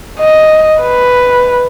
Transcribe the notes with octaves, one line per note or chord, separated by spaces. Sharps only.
D#5
B4